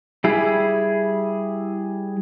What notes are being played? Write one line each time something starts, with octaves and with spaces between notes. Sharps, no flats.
G3 E4 G#4